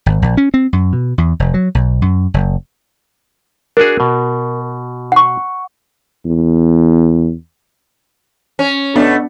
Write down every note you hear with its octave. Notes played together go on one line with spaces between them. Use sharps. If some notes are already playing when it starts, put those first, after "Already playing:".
G#1
A#1
C#4
C4
F#2
B2
E2
F1
F#3
B1
F#2
F#1
D4 F#4 G#4 A#4
B2
F#5 C#6
E2
C#4
B2 A3 B3 D4